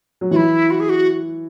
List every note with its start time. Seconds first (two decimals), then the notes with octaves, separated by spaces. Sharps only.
0.21 F#3
0.31 E3 E4 F#4
0.70 F#4
0.80 G#4
0.89 F#4